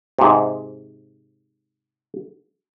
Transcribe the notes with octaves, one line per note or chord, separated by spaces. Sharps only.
G#2 C3